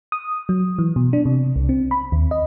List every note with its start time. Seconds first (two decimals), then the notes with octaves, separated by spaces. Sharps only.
0.12 D#6
0.49 F#3
0.79 E3
0.96 B2
1.13 D4
1.25 C3
1.56 C2
1.69 C4
1.91 B5
2.12 D#2
2.31 D#5